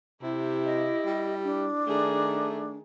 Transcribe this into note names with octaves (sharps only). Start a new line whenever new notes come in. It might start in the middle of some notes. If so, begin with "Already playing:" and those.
C3 E4 G4
D#5
G3
D4
D#3 A3 G#4